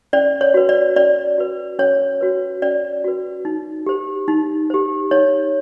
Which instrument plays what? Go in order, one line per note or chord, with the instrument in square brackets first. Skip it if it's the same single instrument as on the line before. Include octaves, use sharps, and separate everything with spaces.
[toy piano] C#4 D5
C#5
F#4 B4
D5
C#4 D5
F#4 B4
C#4 C#5
F#4 B4
C#4 D5
F#4 B4
D#4
G4 C5
D#4
G4 C5
D#4 C#5